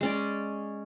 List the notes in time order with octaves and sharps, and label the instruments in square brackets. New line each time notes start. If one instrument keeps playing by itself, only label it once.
[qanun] G#3 C#4 D5